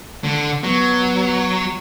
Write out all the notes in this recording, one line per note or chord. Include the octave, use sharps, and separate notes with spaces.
D3
F#3 B3